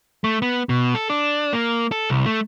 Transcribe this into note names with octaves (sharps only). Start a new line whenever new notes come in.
A3
B3
B2
A4
D4
A#3
A4
C2
A3